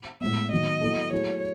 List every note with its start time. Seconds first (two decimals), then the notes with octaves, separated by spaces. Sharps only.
0.21 A2 G#3 B3 E5
0.51 D#3 F#3 B3 D#5
0.81 F#3 B3 E4 A4
1.12 F#3 A3 E4 G#4 C#5